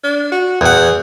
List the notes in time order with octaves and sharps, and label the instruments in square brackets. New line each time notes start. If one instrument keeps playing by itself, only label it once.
[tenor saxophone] D4
F#4
[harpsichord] E2 F#5 [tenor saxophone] G#4